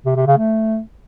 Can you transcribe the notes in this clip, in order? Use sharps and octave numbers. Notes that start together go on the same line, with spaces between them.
C3
C3
C#3
A3